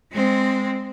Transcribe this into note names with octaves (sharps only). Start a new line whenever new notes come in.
G#3 C4